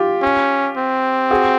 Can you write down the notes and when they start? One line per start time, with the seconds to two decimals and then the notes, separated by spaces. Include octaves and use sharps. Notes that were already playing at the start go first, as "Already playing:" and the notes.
Already playing: F4 G4
0.22 C#4
0.77 C4
1.31 F#4 G#4